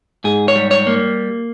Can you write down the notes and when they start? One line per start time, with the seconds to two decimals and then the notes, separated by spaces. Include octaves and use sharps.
0.24 G#2 G#4
0.48 C#5
0.55 G3
0.71 C#5
0.87 A#3